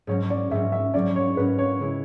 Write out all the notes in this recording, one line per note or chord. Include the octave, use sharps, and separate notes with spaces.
G#2 F#3 C#4 C#5
D5
G#2 F#3 C#4 E5
E5
G#2 F#3 C#4 D5
C#5
G#2 F#3 C#4 B4
C#5
C#3 G#3 C#4 E4